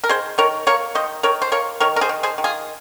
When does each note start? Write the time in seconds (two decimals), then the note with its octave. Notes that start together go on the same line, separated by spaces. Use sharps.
0.04 A#4
0.09 D#3 G#4 C5
0.38 D#3 A#4 C#5
0.67 A#3 A#4 C#5
0.95 D#3 C5 D#5
1.23 D#3 A#4 C#5
1.42 C5
1.52 A#3 A#4 C#5
1.80 D#3 A#4 C#5
1.96 A#4
2.01 G#4 C5
2.09 D#3
2.23 G#4 C5
2.38 D#3
2.44 F4 G#4